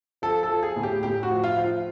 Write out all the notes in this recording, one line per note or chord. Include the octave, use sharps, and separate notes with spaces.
F3 A4
A4
F3
G#4
A2
G4
A2 G4
F#4
F3
F4
F3
F4